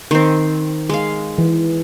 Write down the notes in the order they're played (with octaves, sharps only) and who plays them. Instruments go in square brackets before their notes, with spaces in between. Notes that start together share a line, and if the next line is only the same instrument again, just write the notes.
[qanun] D#3 C4
G#3 F5
[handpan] E3